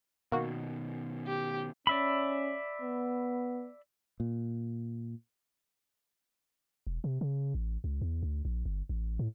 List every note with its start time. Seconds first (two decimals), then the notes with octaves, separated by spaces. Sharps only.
0.32 B2 D#3 A#3 F#4
1.27 G4
1.87 C#4 D5 E5 B5
2.82 B3
4.20 A#2
6.87 E1
7.04 C3
7.21 C#3
7.55 A1
7.84 C#2
8.02 E2
8.23 D2
8.45 A#1
8.66 G1
8.89 A1
9.19 A2